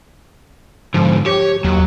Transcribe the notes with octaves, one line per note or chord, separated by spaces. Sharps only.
G#2 D3 F3
G4 C#5
D#2 F#3